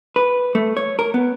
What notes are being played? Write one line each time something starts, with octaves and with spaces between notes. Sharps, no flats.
B4
A3
C#5
A#4
B3